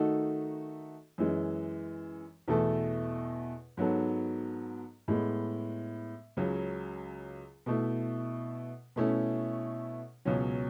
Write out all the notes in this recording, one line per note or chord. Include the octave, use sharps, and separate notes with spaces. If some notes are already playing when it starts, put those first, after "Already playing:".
Already playing: D#3 A3 D#4 F#4 A4
F#2 E3 G#3
E2 B2 A3 E4 A4
G#2 F#3 B3 F#4 A4
A2 G#3 B3
C#2 C#3 F#3
B2 A3 E4
B2 A3 C#4 E4
C#2 B2 F#3 C#4